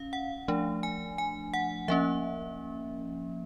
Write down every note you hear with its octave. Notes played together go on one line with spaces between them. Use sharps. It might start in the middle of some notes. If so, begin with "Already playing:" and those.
Already playing: C#4 F5
F#5
F3 A3 D4
G#5
G#5
F#5
F3 A#3 C#4 E5